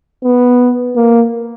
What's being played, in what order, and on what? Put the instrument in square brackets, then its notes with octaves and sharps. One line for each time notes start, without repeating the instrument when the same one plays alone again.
[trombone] B3
A#3